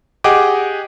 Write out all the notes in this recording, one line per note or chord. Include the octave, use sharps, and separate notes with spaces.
G4 G#4 D#5 F#5 G5 D6